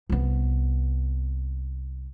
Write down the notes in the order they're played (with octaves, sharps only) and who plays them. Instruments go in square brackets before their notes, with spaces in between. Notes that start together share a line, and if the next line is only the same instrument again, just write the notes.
[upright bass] C2 B3